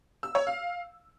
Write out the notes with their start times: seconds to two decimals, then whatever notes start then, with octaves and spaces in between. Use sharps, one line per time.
0.23 E6
0.35 C#5
0.47 F5